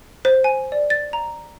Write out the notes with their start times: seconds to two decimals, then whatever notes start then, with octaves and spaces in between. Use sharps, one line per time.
0.25 C5
0.44 G#5
0.72 D5
0.90 A6
1.13 A#5